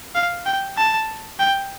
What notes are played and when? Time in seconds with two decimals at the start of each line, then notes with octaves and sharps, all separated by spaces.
0.15 F5
0.46 G5
0.77 A5
1.39 G5